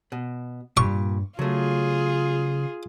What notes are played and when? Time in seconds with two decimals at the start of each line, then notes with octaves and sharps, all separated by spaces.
0.12 B2
0.77 G2 A#2 G3 C#6
1.39 C#3 F#3 A3 F4 G#4